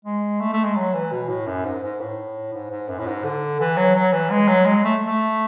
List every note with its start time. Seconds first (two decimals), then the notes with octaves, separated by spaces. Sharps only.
0.05 G#3
0.40 A3
0.53 A3
0.64 G#3
0.76 F#3
0.94 E3
1.11 B2
1.29 A2
1.46 F#2
1.65 G#2
1.83 G#2
2.00 A2
2.53 G#2
2.70 G#2
2.89 F#2
2.98 A2
3.06 G#2
3.24 D3
3.60 E3
3.77 F#3
3.95 F#3
4.12 E3
4.30 G#3
4.48 F#3
4.65 G#3
4.84 A3
5.06 A3